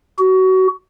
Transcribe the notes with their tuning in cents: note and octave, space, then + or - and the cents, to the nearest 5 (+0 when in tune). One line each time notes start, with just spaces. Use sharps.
F#4 +25